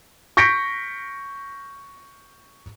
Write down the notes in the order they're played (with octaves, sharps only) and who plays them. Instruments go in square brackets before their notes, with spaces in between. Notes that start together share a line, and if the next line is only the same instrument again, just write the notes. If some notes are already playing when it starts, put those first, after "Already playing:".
[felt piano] C#6 G6 A#6 B6 C#7 D7